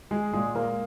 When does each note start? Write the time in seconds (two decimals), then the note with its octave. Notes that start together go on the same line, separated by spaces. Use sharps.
0.11 G#3 G#4
0.33 A#2 G#3 G#4
0.55 G#3 A#3 A#4